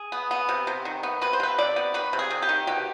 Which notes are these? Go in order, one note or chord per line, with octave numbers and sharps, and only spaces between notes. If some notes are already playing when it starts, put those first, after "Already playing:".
Already playing: G#4
B3
B3
C3
C3
D#3
B3
C3 B4
C5
C3 B4
C3 D5
B3
D#3 B4
C3
G#4
C3
G4
D#3
B2 G4